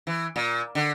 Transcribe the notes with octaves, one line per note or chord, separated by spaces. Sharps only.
E3
A#2
D3